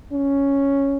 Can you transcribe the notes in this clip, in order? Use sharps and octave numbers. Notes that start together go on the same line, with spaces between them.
C#4